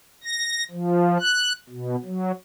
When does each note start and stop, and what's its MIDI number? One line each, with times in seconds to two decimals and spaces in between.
0.24 0.64 94
0.70 1.17 53
1.19 1.52 90
1.70 1.96 47
2.05 2.32 54